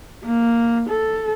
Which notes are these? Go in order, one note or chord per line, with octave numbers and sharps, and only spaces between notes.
A#3
A4